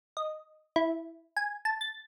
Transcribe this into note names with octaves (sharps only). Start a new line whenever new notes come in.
D#5
E4
G#5
A5
A6